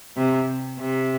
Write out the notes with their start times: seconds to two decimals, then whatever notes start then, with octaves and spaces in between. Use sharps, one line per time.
0.17 C3
0.79 C3